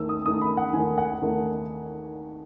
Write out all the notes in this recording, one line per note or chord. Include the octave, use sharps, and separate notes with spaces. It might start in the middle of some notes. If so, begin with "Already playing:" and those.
Already playing: D#2 D#3 A3 D#4 E6
D#6
D#2 D#3 A3 D#4 D#6
B5
F#5
D#2 D#3 A3 D#4 G#5
F#5
D#2 D#3 A3 D#4